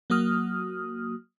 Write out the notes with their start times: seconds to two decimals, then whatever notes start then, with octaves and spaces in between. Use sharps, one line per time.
0.10 F#3 A#3 F#4 D#6 F6